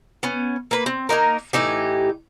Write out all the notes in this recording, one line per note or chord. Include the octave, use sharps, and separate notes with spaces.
B3 C#4
A#3 B4
C4
A#3 C#4 D#4 A#4
A2 E3 D#4 G4